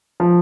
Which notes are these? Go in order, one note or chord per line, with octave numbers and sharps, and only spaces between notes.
F3